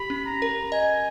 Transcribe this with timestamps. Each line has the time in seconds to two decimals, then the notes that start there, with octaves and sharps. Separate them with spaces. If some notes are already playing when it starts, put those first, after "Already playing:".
Already playing: G4 B5
0.10 C#4
0.26 A#5
0.42 A#4
0.72 D#5 G#5